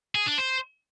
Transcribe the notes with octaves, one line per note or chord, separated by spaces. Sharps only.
G#4
D4
C5